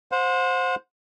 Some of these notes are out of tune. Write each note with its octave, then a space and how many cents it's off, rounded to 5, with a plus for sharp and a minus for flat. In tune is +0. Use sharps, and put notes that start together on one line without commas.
C5 +0 F#5 -40